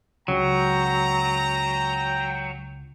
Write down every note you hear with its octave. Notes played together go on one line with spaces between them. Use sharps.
C#2 C#3 F#3 G5 A#5